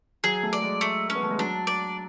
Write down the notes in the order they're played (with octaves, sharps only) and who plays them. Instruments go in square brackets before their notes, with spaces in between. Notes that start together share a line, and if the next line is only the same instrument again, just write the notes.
[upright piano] F#3 [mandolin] G#4
[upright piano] A3
[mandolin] D5
[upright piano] G#3
[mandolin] A3
C#4
[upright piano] B3
A3
G#3
[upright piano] F#3 [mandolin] D4
[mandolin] D5